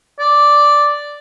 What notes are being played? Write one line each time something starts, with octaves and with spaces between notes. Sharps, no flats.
D5